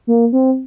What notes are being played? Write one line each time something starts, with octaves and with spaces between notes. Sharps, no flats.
A#3
C4